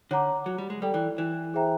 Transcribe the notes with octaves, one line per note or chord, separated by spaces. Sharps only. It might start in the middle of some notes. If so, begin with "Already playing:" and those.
D3 C#5 F#5 A#5 D6
F#3
G3
G#3
G3 A4 D5 G5
E3
E3
G#4 C5 E5 G5 A#5